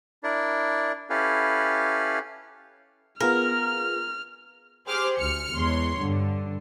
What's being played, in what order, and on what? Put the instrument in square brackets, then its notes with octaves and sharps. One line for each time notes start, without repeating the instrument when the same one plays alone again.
[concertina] D4 E4 A#4 D5
C#4 E4 G4 A4 B4 F5
[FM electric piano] B3 F4 G#4 [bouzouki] A#4 [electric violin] F6
[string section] G4 G#4 C5 C6 D6 F6
D2 F6 C#7
E2 G#3 C#5 C6
G2 D3